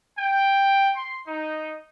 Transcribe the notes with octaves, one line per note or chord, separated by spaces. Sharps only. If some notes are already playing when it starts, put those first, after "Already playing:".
G5
C6
D#4